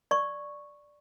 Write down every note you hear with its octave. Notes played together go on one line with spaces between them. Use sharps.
D5 C#6